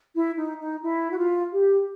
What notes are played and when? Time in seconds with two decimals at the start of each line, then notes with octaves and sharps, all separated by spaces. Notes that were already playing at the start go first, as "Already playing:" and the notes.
0.15 E4
0.38 D#4
0.60 D#4
0.83 E4
1.10 F#4
1.17 F4
1.52 G4